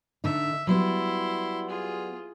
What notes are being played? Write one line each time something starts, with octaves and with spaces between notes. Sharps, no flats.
D3 D#4 E5
F#3 G3 B3 E4 C6
F4 G#4